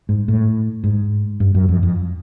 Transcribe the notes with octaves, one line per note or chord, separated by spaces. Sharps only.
G#2
A2
G#2
G2
F#2
F2
F2